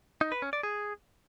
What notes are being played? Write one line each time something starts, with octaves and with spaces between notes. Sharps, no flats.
D#4
B4
C#4
D5
G#4